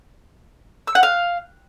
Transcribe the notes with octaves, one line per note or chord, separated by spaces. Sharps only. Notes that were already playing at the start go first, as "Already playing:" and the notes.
E6
F#5
F5